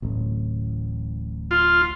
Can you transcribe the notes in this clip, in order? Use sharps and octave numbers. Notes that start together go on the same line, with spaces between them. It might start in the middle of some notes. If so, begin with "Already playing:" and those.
D1 A1
F4